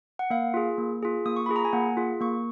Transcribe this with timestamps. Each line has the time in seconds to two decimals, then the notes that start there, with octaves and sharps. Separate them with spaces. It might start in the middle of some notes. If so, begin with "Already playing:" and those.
0.19 F#5
0.30 A#3 F5
0.54 F4 G#4
0.78 A#3
1.03 F4 G#4
1.26 A#3 D#6
1.36 C#6
1.46 F4 G#4 B5
1.56 A#5
1.65 G#5
1.73 A#3 F#5
1.97 F4 G#4
2.20 A#3 C#6